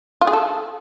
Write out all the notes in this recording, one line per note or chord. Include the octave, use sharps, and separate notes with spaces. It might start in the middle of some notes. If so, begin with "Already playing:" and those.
F4
G#4
A4